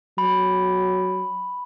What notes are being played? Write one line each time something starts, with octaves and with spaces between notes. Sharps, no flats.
F#3 B5